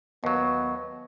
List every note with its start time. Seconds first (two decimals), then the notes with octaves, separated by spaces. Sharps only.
0.24 D#2 F#3 B3